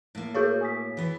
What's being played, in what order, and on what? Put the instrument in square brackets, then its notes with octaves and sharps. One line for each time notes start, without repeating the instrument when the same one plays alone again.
[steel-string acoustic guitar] A2 A#3
[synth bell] F#4 G#4 C#5 [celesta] A#4 C#6 G6
[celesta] G#5 D#6 B6
[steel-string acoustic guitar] E3 B3